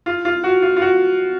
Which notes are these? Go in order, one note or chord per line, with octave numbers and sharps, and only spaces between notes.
F4
F4
F#4
F4
F4
F#4